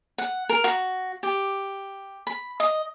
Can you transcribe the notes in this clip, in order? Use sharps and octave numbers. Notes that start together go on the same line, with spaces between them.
F#5
A#4
F#4
G4
B5
D#5